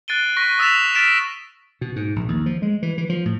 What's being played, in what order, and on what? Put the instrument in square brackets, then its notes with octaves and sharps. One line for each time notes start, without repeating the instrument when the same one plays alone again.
[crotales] F#6 A6 C7 D7 D#7 G7
C#6 F#6 A#6 B6
D#6 E6 A6 B6 E7 F7
F6 A6 B6 D7 E7
[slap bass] B2
G#2
A#1
D#2
F3
G#3
E3
E3
F3
A2